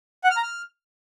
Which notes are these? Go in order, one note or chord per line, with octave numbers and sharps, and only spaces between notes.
F#5
F6
A#5
F6